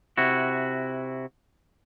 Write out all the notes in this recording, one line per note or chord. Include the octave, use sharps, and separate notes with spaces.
C3 E4 F#4